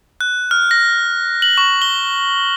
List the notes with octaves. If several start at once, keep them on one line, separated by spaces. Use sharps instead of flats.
F#6
F6
A#6
F#7
C#6
G7